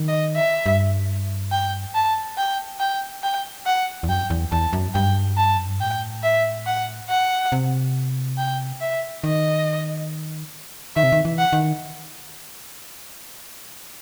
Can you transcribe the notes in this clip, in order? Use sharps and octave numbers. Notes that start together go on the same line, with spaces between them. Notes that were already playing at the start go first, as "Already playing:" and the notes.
Already playing: D#3
D#5
E5
G2
G5
A5
G5
G5
G5
F#5
E2
F#2 G5
E2
E2 A5
F#2
G2 G5
A5
F#2
G2
A2 G5
E5
F#5
F#5
C3
G5
E5
D#3 D#5
D#3 E5
C3
D#3
E3
F#5
D#3